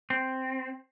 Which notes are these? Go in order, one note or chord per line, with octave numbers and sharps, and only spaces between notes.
C4